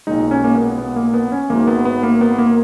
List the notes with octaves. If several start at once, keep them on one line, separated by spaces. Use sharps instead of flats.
B1 A#2 G#3 D#4
C#4
A#3
B3
B3
A#3
B3
C#4
G#1 G#2 F#3 A#3
B3
B3
A#3
B3
A#3